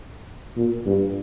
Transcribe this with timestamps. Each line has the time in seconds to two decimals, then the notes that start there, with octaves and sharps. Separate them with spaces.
0.56 A#2
0.86 G2